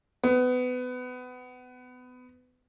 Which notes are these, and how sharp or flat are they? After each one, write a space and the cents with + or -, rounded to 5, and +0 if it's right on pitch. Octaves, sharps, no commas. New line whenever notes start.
B3 +25